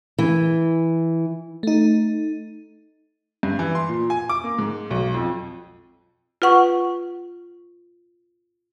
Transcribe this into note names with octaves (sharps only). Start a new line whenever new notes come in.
E3
A3 D#4
G2
E3
C6
A#2
G#5
D6
A#3
G#2
B1
F2
F4 B4 F#5 C#6